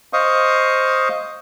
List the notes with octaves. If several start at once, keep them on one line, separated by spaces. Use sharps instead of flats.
C5 D#5 F5 C#6 D#6